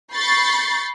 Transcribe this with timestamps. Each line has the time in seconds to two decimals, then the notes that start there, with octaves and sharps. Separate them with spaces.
0.14 B5 C#6 G6 A6 C7